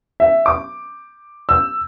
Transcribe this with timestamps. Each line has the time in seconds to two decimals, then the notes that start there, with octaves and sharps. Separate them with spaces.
0.20 E5
0.46 D6
1.49 E6